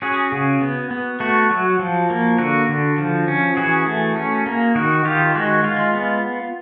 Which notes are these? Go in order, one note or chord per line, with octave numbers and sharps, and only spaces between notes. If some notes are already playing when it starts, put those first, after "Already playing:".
C#4 F#4 G#4
C#3
B3
B3
A3 F#4
F#3
F3
A#3
D3 F#4
D3
F3
C#4
E3 F#4 G#4
A3
C#4
A#3
D#3 F#4
D#3 F4 G4
G#3 F#4
G#3 F4
B3